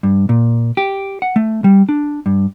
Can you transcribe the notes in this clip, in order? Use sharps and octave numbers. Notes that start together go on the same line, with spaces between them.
G2
A#2
G4
F#5
A3
G3
D4
G2